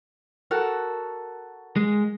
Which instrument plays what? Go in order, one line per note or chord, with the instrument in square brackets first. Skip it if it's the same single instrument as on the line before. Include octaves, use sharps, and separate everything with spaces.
[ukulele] F#4 A4 A#4
[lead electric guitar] G#3